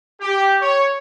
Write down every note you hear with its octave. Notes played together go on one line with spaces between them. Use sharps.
G4
C#5